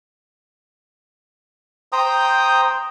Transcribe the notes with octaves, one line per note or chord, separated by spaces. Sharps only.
C5 G5 A#5 D#6